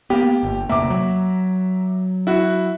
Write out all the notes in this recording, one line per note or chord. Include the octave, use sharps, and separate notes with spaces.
A#3 B3 G4
G1
E2 C3 A#3 E5 A#5 D6
F#3
E4 F#4